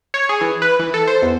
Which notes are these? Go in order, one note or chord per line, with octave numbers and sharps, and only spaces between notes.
C#5
G#4
E3
B4
E3
A4
C5
E2